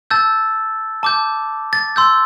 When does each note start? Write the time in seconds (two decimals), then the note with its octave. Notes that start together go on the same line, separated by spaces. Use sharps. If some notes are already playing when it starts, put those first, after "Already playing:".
0.11 A5 E6 G6 A6
1.03 A5 D6 G6
1.73 A6
1.96 C6 E6 G6